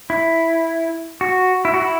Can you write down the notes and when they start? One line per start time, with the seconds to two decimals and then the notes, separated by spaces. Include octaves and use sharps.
0.10 E4
1.21 F#4
1.65 E4
1.74 F#4
1.82 E4